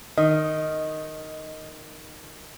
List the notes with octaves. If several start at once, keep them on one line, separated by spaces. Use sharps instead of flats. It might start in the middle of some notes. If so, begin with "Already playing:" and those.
D#3 D#5